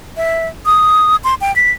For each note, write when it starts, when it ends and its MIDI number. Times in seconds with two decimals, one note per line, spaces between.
0.17 0.48 76
0.66 1.16 87
1.24 1.35 84
1.41 1.54 79
1.56 1.71 95